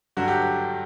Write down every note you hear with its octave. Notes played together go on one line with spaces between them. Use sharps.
G2 D3 F#3 F#4
G4